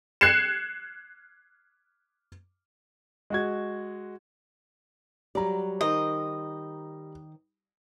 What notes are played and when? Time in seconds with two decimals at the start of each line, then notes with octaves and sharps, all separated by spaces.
0.21 F#6 G#6 C7 C#7 E7
3.30 G#3 F#4 G#6
5.35 F#3 G3 D5 A#5
5.81 D#3 A#4 C5 D#5